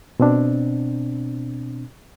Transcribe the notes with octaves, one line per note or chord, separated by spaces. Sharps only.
B2 C4 D4